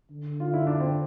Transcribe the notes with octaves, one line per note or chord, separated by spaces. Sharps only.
D3
F4
E4
D4
C4